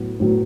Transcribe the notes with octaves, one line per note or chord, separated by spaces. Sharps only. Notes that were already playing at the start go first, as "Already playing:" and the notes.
Already playing: A2 F#3 B3
A2 F#3 B3